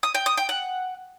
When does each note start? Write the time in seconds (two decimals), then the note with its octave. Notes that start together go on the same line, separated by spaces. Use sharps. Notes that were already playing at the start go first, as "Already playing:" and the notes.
0.03 D#6
0.15 G5
0.26 D#6
0.37 G5
0.49 F#5